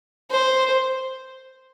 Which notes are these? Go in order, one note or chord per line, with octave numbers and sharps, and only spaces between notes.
C5